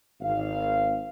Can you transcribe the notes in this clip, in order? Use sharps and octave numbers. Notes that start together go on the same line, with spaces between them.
G#1 F5